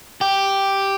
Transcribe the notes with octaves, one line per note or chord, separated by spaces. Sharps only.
G4